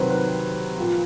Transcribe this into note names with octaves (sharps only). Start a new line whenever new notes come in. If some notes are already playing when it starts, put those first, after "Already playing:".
Already playing: C3 D#3 F#3 B4 C5
B4
A#2 F3